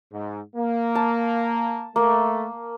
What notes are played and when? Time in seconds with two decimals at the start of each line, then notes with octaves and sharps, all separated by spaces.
0.12 G#2
0.56 A#3
0.95 A5
1.96 A3 A#3